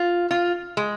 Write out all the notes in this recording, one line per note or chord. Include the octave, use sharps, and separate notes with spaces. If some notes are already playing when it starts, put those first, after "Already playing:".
Already playing: F4
F4
G#3